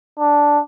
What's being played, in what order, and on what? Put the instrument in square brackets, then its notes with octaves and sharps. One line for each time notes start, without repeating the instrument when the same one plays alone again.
[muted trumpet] D4